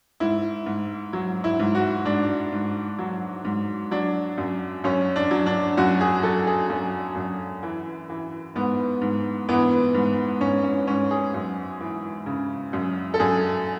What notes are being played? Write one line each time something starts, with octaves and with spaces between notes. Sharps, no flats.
G#2 E4
G#2
F#3
E4
G#2
F#4
G#2 D4
G#2
F#3
G#2
F#3 D4
F#2
F#2 C#4
D4
F#3
D4
F#2 F#4
G#4
F#3 A4
G#4
F#2
F#2
E3
E3
G#2 B3
G#2
E3 B3
G#2
G#2 C#4
C#4
G#2 C#4
G#4
F#2
E3
C#3
F#2
A4
F#2 G#4